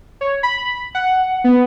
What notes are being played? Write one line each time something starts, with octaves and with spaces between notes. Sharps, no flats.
C#5
B5
F#5
B3